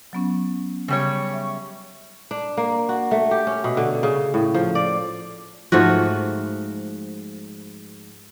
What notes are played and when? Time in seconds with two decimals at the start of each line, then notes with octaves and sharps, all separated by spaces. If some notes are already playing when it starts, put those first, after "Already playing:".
0.13 F#3 B3 C#4
0.88 C#3 G3 C#5
1.29 E5 C#6
2.31 D4
2.57 A#3
2.89 F#4
3.11 A3
3.31 G4
3.47 C#4
3.64 B2
3.77 D3
4.03 C#3
4.34 A2
4.54 F3
4.75 D5
5.72 G#2 F3 A3 F#4